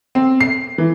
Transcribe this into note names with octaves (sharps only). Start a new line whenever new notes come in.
C4
C7
E3